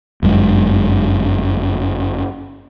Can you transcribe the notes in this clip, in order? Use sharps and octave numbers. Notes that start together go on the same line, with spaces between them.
G1 F#2 G#3